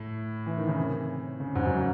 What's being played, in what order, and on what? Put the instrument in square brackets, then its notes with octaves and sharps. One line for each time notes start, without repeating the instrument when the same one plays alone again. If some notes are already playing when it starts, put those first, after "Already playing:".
Already playing: [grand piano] A2
E3
D#3
C#3
C3
C#3
G#2
F#2